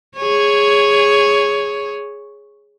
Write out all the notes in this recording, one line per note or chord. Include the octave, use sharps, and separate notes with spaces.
G#4 C#5